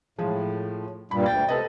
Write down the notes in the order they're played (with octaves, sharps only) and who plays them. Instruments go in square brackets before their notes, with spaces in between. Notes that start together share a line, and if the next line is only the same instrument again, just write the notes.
[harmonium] A2 [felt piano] F3 G#3
[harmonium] G2 A#2 G3 [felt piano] B5
[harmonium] D2 G5 [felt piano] A6
[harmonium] C3 [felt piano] A4 B4 D#5